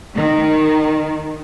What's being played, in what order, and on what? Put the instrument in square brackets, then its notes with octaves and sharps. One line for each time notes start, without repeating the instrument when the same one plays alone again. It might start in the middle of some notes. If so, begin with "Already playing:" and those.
[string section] D#3